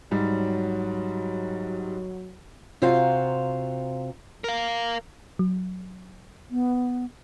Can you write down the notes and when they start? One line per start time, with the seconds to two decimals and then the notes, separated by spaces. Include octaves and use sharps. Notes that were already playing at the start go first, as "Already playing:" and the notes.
0.11 G#2 F#3 G3
2.82 C3 F4 F#4 C5 F5 A#5
4.44 A#4 F5
5.39 F#3
6.50 B3